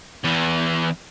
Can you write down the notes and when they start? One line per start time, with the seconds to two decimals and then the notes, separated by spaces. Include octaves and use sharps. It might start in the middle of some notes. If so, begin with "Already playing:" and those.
0.24 E2 E3